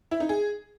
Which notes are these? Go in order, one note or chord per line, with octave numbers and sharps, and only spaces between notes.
E4
D#4
G#4